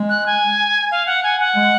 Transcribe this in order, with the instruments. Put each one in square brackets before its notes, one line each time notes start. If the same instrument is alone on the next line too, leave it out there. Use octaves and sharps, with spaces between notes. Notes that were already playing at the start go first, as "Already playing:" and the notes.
Already playing: [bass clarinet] G#3
[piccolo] F#6
G#5
F5
F#5
G#5
F#5
[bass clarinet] G#3